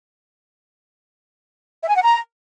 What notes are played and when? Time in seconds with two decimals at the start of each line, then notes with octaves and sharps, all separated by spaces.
1.82 E5
1.89 G#5
1.96 F#5
2.02 A#5